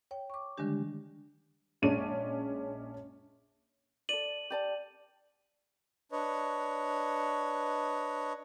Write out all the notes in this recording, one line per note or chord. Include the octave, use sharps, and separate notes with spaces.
C#5 G5
C#6 D6
D3 D#3 G3 G#3 D4 G4
A#1 G#3 C#4 D4 D#7
A4 D5 D#7 F#7
G4 D5 A5
D4 B4 C#5 D#5